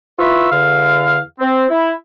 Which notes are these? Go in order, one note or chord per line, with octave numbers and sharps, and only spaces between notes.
E4 F4 B4 B5 C#6 E6
E2 D3 F5
C4
E4